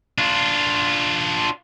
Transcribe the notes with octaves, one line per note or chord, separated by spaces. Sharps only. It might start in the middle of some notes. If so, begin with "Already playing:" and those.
D4 F4